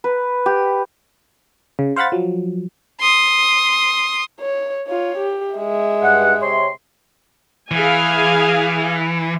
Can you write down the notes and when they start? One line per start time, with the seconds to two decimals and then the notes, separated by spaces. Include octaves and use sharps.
0.04 B4
0.46 G4
1.79 C#3
1.96 C5 F5 F#5 B5 A6
2.12 F3 F#3
3.01 C6 D#6
4.41 C#5
4.87 F4 C#5
5.18 G4
5.55 G#3 E5
6.02 G2 F#5
6.41 C3 C#5 C6
7.71 E3 G#4 F5 G#5